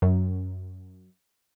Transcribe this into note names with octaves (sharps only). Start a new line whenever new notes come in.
F#2